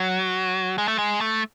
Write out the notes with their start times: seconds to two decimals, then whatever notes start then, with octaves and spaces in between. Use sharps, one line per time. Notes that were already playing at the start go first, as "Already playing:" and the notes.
Already playing: F#3
0.78 G#3
0.88 A3
0.98 G#3
1.21 A3